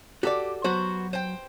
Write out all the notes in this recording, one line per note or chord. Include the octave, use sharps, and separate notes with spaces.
F#4 G4 A4 D5
F#3 B3 F#4 C5
C5 G5